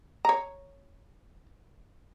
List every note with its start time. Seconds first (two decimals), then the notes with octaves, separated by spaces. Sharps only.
0.25 C#5 A#5